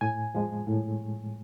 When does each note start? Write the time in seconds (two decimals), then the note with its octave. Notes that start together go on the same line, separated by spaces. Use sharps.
0.01 A2 G#5
0.35 F3 G#3
0.67 A2